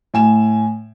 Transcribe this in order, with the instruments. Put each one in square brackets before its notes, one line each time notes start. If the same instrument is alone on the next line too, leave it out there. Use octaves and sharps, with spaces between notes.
[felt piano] A2 G#5 E7